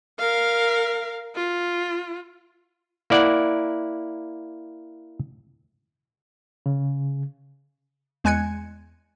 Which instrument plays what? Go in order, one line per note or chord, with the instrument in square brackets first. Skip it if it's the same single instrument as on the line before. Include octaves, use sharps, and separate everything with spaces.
[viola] A#4 F5
F4
[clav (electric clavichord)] A#3 E4 D5 F#5
[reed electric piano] C#3
[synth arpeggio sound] E2 G#3 G#5 F#6 G#6 C#7